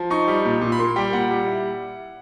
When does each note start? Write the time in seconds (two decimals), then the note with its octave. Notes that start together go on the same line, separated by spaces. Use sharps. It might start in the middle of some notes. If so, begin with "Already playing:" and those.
Already playing: F3
0.10 D#4 C#6
0.28 G3
0.45 A#2
0.61 A#2
0.72 B5
0.79 A#3 C6
0.96 G3 G5
1.13 A#2 F#5
1.31 G3
1.47 E4